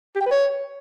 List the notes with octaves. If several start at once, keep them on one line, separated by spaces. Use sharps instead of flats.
G4
G5
B4
C#5